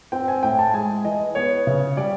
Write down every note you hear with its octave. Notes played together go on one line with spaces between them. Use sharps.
C4 G5
G#5
A2 G5
A5
G#3 G#5
E3 D#5
B3 C#5
C#3
G3 D5